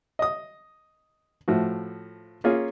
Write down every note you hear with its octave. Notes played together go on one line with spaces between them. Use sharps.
D#5 D#6
A2 F3 F#4
A#3 C#4 F4 G#4